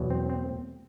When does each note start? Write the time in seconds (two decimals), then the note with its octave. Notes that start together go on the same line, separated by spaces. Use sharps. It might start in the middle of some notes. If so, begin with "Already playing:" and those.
Already playing: E2 B2 F#3
0.10 C4
0.30 C4